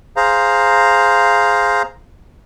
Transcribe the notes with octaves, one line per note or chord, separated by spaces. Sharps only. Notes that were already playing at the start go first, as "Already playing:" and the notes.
G#4 C5 F5 A#5